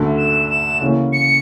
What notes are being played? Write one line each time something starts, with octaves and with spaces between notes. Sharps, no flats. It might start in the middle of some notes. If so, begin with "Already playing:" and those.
Already playing: D2 D3 A3
E7
E7
C#3 E3 A#3 C#4
C#7